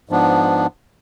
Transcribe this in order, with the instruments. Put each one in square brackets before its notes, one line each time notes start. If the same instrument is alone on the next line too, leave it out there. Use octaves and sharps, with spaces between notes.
[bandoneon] G#2 F3 B3 D4